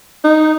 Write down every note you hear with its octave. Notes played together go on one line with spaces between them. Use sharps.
D#4